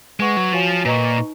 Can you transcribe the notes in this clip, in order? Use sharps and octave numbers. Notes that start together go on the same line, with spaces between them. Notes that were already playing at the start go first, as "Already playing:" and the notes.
G#3 B4 F#5 C#6
F#3
F3 F#4 C#5 F5 G#5
A#2 B4 D#5 A#5 C#6
D#4